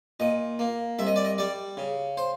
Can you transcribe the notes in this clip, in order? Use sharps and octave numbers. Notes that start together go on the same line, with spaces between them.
A#2 D#5
A#3
C2 E5
D#5
D5
D#5
G3 D5
C#3
C5